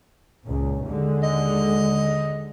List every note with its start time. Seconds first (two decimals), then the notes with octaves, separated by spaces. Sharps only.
0.47 C#2 A#2 C#4
0.85 D#2 D3 G#3
1.23 D#5